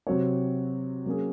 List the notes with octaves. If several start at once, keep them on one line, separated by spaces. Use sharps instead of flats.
C3 F#3 C4 F#4 C#5
F#3 A#3 C#4 G#4